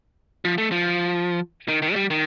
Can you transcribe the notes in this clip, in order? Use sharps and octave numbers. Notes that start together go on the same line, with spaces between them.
F3
A3
F3
D#3
D#3
A3
G3
D#3